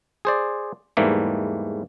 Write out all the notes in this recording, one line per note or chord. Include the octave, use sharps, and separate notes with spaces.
G#4 C5 D5
E2 G#2 E3 G3 A3 A#3